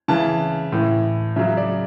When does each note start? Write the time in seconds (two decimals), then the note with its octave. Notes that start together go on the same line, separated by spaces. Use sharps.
0.08 C#3 E3 A5
0.72 A2 E3
1.36 C#3 F#3 E5
1.57 D5